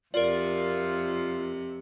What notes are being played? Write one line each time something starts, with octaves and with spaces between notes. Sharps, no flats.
F2 C3 F4 A#4 D5